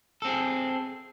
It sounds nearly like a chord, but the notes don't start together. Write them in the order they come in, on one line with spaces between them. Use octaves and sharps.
A4 C4 G#4